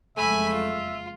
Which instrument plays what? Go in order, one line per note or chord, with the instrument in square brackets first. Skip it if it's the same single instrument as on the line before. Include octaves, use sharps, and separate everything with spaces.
[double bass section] F#1 F2 G#3 [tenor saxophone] A3 [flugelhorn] E5 [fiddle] G#5 B5
[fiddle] F4